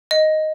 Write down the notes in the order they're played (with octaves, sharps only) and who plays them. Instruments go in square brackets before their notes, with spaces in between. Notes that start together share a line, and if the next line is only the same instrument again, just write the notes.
[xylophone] D#5